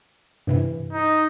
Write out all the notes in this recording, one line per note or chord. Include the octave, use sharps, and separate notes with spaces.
G2 C3 E3
D#4